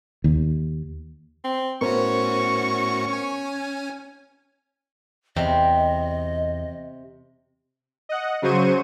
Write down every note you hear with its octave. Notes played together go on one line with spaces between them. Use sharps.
D#2
C4
A2 B3 C#4 F#4 A#4 C5 C#6
C#4 G#5
E2 C3 D#5
D#5 F#5
C#3 F#3 C5 C#6 D#7